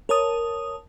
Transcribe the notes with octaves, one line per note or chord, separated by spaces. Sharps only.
A#4 C#5 A5 D#6